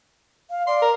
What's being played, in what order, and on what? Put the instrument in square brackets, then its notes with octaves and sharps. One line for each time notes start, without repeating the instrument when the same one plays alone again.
[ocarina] F5
[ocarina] D5 [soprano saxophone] C6
[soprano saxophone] A#4